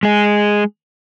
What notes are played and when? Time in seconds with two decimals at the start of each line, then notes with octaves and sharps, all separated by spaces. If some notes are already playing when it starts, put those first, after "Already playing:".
0.03 G#3 G#4